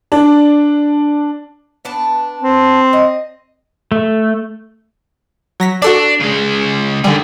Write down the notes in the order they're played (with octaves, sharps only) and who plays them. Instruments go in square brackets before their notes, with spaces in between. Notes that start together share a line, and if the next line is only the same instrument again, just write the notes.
[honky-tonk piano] D4
[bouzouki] B3 D4 A5
[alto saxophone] C4
[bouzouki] D#5
[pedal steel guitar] A3
[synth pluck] F#3 A#6 B6
[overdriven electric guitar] D4 [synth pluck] F#4 A4 D5
[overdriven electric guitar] C#3 G#3
[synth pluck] D3 G3 [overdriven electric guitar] D#3 G#4